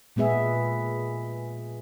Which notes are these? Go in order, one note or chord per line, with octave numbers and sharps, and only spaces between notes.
A#2 G#3 B3 G#4 E5